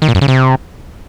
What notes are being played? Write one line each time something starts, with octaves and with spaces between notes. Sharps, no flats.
D#3
A#2
F#2
C#3
C3